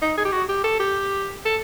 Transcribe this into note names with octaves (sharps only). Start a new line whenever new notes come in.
D#4
G#4
G4
F#4
G4
A4
G4
A4